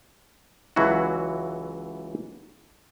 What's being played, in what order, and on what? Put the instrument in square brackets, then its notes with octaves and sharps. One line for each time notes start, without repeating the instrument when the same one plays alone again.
[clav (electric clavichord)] C#2 E3 F#3 E4 F#4